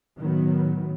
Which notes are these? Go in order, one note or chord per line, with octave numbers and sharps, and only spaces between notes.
A2 D#3 F#3 B3